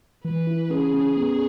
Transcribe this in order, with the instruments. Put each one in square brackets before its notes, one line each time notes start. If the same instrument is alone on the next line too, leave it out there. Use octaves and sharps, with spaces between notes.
[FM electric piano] E3 [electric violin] B4
[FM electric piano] E4
[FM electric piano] C#4 [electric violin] G#4
[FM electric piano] C#4
B3